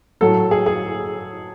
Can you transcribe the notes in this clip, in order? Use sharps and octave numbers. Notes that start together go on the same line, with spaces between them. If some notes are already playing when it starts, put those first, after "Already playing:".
A2 F#3 A4
G#4
G#4